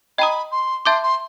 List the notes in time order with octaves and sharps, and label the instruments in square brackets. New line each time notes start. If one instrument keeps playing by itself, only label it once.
[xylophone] D#5 G5 A#5 D#6 [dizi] B5
[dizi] C6
[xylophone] E5 A5 D6 G6 [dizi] C6
[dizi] C6